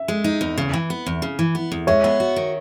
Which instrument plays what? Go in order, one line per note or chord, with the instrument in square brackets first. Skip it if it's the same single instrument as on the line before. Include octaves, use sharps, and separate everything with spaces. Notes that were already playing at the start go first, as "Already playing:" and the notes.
Already playing: [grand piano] E5
[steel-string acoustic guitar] G#3
D#4
E2
C#3
E3
B3
E2
C#3
E3
B3
E2
[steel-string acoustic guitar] G#3 [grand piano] C#5 E5
[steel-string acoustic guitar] B3
F#4
D#3